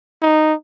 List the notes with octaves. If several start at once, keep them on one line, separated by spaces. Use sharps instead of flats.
D#4